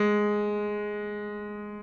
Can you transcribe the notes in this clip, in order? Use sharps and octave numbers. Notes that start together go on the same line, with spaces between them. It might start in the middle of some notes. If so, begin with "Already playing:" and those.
Already playing: G#3